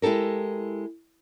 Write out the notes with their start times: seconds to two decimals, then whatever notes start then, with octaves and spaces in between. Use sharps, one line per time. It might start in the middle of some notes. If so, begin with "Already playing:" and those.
0.02 G#3 E4 G4 A4 A#4